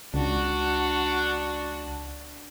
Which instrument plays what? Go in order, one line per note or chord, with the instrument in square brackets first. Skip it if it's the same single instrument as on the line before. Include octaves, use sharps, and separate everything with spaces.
[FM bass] C#2 [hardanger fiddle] D4 F#4